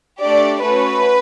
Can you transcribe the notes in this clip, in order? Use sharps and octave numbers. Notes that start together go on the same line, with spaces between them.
A3 D4 G4 D5
A3 C#4 F#4 B4